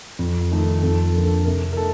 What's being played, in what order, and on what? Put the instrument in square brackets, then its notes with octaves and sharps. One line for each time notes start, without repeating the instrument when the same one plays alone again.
[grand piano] F2
D#3 A3 D#4
F2 A4
D3 F3 A#3
A4
C3 A#4
A#4
A#3 D#4 A4